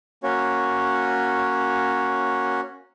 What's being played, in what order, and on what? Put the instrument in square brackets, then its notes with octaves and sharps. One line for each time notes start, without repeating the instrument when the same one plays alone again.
[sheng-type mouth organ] A#3 C#4 F#4 C#5